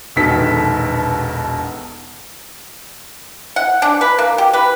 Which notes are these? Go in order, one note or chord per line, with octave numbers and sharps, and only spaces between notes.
E1 A#1 B2 D#3 A4 B6
F#5
D4
B4
A#3
G4
B4